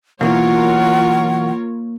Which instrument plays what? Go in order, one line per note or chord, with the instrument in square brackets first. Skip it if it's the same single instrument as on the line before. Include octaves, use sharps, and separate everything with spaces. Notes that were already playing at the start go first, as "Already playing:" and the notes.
[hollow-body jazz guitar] B2 E3 F#3 [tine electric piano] A#3 [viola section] F4 A#4 C#5 [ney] F#5